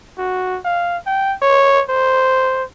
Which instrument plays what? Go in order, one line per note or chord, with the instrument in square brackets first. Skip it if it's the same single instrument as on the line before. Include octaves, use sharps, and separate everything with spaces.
[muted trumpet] F#4
F5
G5
C#5
C5